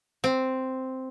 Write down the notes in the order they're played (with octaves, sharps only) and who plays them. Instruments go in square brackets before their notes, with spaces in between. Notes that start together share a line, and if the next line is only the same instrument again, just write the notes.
[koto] C4